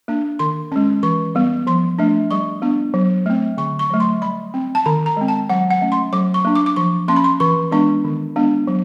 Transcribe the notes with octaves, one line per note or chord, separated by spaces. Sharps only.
A#3 D4
D#3 C6
G#3 C#4
E3 C#6
G3 B3
F3 C6
A3 D4
G3 C#6
B3 D4
F#3
A3 C4
D3 C#6
C#6
F#3 A3
C6
G3 B5
C4
A5
D#3 A#5
A#5
G#3 C4
A5
F#3 F#5
F#5
A3 C#4
C6
F#3 D6
C#6
A#3 D4
D6
D6
F3 C#6
A#3 C#4 C6
B5
C6
E3 C#6
G#3 B3 D4 C#6
D#3
G#3 B3 D4
F#3